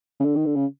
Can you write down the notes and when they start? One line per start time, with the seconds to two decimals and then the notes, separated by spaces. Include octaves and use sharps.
0.20 C#3
0.25 D3
0.36 D#3
0.46 D3
0.56 C#3